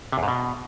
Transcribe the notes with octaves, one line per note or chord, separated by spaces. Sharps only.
C3
E2
G#2
B2